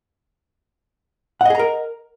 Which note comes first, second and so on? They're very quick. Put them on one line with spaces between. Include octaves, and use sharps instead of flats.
F#5 D#5 G#4 A#5 A#4